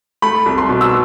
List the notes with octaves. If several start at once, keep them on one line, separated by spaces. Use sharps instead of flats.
A3 B5
C2
C6
B2
E6